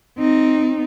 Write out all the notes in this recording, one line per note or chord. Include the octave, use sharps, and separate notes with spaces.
C4 D#4